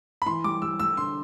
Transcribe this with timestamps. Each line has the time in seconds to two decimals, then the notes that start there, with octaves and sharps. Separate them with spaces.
0.22 B5
0.26 E3 C6
0.44 G3 D6
0.62 G3 E6
0.80 G3 E6
0.97 D3 C6